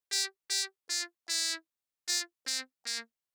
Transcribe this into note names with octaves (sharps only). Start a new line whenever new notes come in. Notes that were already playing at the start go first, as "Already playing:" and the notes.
G4
G4
F4
E4
F4
C4
A#3